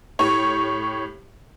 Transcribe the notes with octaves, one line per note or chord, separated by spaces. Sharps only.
A2 G4 C#5 C#6